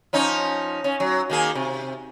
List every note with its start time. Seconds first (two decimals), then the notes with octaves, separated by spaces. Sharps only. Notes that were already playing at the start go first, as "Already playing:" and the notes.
0.13 F3 C#4 D#4
0.84 C#4
1.00 F#3
1.30 D#3 A#3 G#4
1.55 C3